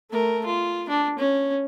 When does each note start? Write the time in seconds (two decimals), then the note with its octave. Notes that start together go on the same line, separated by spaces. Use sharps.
0.11 A3 A#4
0.46 F4
0.89 D4
1.19 C#4